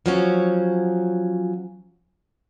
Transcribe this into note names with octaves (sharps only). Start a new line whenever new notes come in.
F3 F#3 C#4